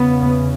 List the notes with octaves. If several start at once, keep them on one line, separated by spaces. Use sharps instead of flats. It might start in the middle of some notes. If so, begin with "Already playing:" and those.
Already playing: E2 C#3 B3